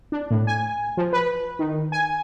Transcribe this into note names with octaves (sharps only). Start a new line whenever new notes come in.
D4
A2
G#5
F3
B4
D#3
G#5